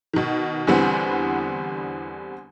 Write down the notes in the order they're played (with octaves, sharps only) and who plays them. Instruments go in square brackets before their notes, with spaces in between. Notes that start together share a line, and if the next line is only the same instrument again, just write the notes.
[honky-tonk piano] B2 D#3
E2 D3 E3 G3 B3 C4